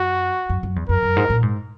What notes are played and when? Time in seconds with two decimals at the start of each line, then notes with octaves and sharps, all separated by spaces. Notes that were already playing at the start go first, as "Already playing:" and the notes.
Already playing: F#2 F#4
0.50 F#2
0.63 F#2
0.76 E2
0.89 F#2 A#4
1.03 F#2
1.17 G#2
1.30 A#2
1.43 G#2